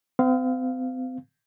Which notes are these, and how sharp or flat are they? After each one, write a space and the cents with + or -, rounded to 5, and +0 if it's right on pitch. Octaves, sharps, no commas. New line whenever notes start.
C4 -40 F5 +0